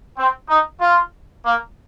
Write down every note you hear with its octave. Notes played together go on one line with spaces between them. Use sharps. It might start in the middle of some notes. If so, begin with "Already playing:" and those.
C4
D#4
F4
A#3